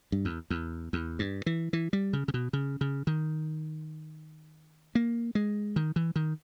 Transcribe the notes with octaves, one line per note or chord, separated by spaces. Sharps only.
G2
E2
E2
E2
G2
E3
E3
G3
C#3
C#3
B2
C#3
C#3
D#3
A#3
G#3
D#3
E3
D#3